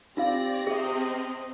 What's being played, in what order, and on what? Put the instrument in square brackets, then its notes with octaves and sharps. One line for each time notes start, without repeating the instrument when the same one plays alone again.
[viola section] C4 [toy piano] D#4 F4 F5 [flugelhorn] G4 [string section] D5 A#6
[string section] C3 C4 [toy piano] G#4 E5 [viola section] D#5